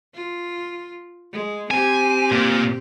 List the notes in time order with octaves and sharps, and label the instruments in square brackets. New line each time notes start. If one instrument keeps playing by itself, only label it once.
[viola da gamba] F4
G#3
[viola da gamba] C4 G4 [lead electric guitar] G#5
[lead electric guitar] A#2